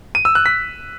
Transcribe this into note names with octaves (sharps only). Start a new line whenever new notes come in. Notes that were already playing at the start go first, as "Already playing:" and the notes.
D#7
E6
F#6
B6